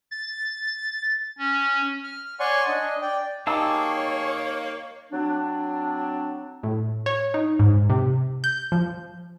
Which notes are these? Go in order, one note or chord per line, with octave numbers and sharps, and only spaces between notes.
A6
C#4
F6
C#5 D5 F#5 G#5 C6 C#6
D4 D#5 G#5
D5 G5
A#3 D#4 G4 G#4 C#5 A5 E6
F#3 C4 D4
A2
C#5
D#4
G#2
C3
G6
F3